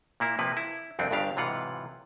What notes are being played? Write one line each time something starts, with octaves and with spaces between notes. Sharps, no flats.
A#2 A#3 E4
C3 F3 A#3 B4
E4
C2 F2 C4 D4
G1 G2 C#3 D4 G4 F5
B1 G#2 C3 E3 F4 F#5